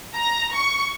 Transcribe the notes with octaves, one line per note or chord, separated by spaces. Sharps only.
A#5
C#6